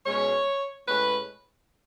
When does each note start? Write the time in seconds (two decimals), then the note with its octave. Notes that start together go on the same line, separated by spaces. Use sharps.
0.06 B2 G#3 C#4 C#5
0.88 A2 G#3 C#4 B4